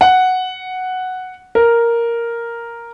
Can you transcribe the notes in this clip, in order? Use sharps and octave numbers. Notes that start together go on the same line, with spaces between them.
F#5
A#4